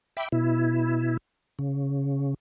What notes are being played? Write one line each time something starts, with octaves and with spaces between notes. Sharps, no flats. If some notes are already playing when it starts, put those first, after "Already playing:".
E5 G5 B5 D6
B2 E4
C#3